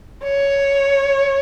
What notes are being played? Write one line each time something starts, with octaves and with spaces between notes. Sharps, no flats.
C#5